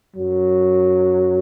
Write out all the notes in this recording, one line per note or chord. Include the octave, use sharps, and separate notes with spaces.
F#2 F#3